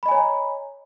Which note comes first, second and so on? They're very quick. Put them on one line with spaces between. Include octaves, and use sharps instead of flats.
B5 D#5 G#5 C#5 A#5